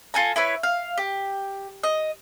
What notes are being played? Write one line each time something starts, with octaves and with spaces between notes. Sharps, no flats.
F4 A4 G#5 A#5
E4 B4 C#5
F5
G4
D#5